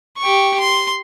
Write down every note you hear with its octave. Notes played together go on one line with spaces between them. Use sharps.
G4 C#6
C6